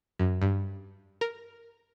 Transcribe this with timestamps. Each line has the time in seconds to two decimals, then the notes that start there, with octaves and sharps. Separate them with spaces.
0.19 F#2
0.42 G2
1.21 A#4